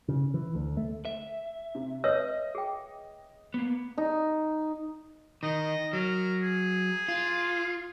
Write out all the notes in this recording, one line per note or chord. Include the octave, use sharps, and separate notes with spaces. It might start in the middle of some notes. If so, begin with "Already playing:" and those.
C#3
E3
D2
A3
E5
C3
B4 C#5 D#5 E6
G#4 G5
A#3 B3
D#4
D#3 D#5
F#3 A#4
G#4
F4